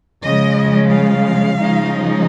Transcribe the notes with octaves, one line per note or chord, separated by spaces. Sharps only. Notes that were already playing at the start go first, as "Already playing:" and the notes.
C#3 F3 G#3 D#5
F5
C#3 F3 G#3 D#4